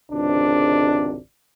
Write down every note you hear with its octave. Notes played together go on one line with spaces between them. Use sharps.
G#1 C#2 C3 D4